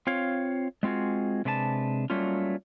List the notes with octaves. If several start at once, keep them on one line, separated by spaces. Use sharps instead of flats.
C4 F4 C#5 F5
G#3 C4 F4 F#4 G#4
C3 G#3 D4 B4 C5 A5
F#3 G3 A3 A#3 C#4 F4